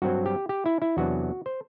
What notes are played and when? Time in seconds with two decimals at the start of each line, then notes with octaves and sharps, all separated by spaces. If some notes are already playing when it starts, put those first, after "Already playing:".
0.02 G2 F#3 C4 F#4
0.26 G4
0.49 G4
0.66 E4
0.82 E4
0.97 E2 C3 F#3 B3 D4 F#4
1.46 C5